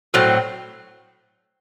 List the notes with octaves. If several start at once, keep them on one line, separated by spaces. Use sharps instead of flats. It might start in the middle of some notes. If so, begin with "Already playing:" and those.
A2 F#3 C4